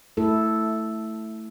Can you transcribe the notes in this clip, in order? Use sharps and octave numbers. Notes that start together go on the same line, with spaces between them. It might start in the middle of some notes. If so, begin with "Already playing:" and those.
A3 E4 A4